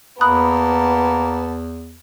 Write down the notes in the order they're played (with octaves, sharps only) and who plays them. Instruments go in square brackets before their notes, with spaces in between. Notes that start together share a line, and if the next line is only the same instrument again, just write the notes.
[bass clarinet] E2 [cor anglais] A#3 [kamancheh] B3 A5 [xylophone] B5 D#6 F#6